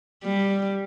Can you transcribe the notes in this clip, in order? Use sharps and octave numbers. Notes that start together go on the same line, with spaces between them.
G3